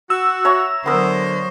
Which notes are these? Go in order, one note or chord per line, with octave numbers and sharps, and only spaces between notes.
F#4 E6
C#5 E5 A#5
D3 F#3 B3 A#4 C5